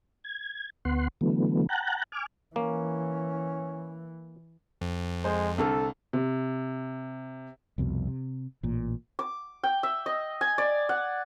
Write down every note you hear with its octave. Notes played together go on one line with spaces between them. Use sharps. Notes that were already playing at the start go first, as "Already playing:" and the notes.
G#6
D2 B3 F#5 C6
D3 E3 F#3 A3 B3
F#5 G5 A5 A#5 F#6
G#5 D6 F6
E3 A#3 C#4
F2
G#3 C5
C2 D3 A4 F6
C3
C2 F2 B2
C3
A1 A#2
D6
G5
E5
D#5
G#5
D5
F#5